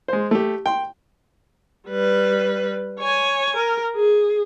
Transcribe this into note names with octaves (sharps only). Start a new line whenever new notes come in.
G#3 C5
A3 G4
G5 C6
G3 B4
C#5 G#5
A#4
G#4